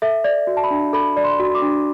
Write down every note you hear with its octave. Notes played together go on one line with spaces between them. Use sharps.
A4 E5
D5
F#4
A5
B5
D4
A4 B5
D5
C6
F#4
D6
D4